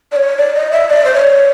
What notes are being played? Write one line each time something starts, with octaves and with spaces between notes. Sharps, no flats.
D5
C#5
D5
D#5
E5
D5
C5
C#5